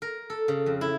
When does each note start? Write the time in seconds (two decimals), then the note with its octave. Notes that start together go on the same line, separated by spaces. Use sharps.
0.02 A#4
0.30 A4
0.48 C#3
0.66 F2
0.81 E4